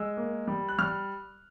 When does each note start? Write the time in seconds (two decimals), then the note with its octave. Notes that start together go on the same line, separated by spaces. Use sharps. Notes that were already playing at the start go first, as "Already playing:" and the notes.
Already playing: G#3 E6
0.17 A#3
0.47 G3
0.69 F#6
0.78 G3 F6